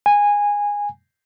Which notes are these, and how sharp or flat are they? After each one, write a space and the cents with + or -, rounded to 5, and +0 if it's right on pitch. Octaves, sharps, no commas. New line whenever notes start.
G#5 -15